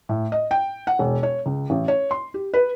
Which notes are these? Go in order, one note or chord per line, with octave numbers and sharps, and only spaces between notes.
A2
D#5
G5
F#5
E1
C#5
C#2
A1
C#5
C6
G4
B4